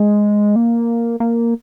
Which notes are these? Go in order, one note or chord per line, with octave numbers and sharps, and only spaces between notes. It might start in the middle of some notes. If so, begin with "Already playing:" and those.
Already playing: G#3
A#3
A#3